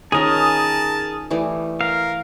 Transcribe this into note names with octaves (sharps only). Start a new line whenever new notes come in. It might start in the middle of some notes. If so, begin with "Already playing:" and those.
D#3 C#4 F4 G#4 A#4 A5 D#6
E3 G3 A3
A#4 F5